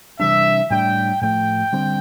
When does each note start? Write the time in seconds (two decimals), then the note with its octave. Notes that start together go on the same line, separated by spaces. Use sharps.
0.20 C3 E3 G3 D4 E5
0.70 A2 G3 D4 G5
1.21 A2 F3 A3 G5
1.73 D3 G3 C4